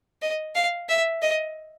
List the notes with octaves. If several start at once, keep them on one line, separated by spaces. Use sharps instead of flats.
D#5
F5
E5
D#5